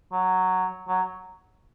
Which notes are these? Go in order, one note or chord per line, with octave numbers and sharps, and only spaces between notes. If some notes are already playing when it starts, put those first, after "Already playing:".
F#3
F#3